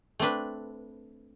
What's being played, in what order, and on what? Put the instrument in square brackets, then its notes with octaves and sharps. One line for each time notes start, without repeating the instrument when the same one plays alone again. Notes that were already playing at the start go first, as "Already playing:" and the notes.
[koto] A3 C4 D4 B4